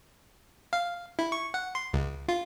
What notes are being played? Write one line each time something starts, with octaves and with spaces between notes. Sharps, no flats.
F5
E4
C#6
F#5
C6
C#2
F4